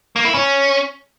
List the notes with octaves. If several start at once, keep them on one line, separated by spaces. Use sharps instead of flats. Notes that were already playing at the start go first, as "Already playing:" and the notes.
A#3
E4
C#4